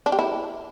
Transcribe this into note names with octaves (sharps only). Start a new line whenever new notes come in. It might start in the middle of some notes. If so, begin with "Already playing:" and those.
D4
G4
E4